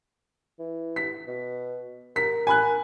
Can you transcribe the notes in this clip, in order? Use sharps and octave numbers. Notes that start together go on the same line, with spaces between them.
E3
B6
B2
A#4 B6
G#5 B5 F#6